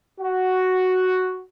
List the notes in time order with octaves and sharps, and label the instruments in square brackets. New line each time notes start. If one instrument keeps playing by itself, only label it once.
[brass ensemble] F#4